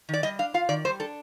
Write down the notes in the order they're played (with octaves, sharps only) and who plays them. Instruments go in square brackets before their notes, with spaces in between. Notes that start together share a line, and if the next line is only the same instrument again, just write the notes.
[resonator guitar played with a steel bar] D#3 D5
G3 D#5
D4 F5
F4 F5
D#3 D5
G3 C5
D4 A4